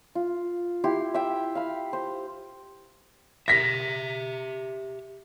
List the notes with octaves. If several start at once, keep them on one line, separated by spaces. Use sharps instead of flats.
F4
E4 G4 C6
E5 G5
F5 B5
C5
G4 E5 A#6 B6